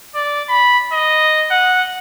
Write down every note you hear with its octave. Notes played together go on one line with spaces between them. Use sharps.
D5
B5
D#5
F#5